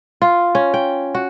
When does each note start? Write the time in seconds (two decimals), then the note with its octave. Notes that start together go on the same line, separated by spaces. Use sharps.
0.22 F4
0.55 C#4
0.74 G5
1.15 F#4